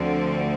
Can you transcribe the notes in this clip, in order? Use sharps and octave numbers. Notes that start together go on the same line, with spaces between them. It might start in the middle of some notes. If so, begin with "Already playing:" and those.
Already playing: D2 D3 F3 C4